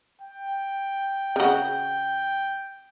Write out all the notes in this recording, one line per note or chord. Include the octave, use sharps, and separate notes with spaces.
G5
C#3 F#4